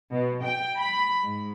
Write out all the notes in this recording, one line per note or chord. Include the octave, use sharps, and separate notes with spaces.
B2
G5
B5
G#2